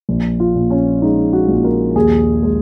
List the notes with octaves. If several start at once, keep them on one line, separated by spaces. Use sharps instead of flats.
A#1
F4
A#2
C#4
G#3 D#4
F#4
A#1
A#4
D#2 G#4
G#3